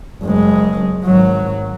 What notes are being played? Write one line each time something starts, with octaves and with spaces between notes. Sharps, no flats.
F#1 G#3
G#1 F#3